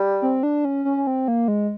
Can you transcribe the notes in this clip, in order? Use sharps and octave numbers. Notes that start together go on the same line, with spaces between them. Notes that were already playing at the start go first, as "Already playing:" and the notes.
Already playing: G3
C4
D4
C#4
C#4
C#4
C4
A#3
G#3